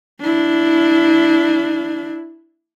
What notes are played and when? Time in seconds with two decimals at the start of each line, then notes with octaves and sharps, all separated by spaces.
0.21 D4 E4